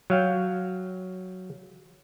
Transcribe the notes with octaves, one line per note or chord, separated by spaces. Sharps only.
F#3 F5 G5